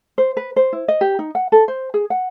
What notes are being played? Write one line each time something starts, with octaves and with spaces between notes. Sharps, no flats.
C5
B4
C5
E4
D#5
G4
D#4
F#5
A4
C5
G#4
F#5